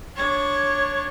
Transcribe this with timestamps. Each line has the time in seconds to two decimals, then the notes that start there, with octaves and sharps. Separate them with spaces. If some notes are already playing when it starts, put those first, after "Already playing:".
0.16 D4 C#5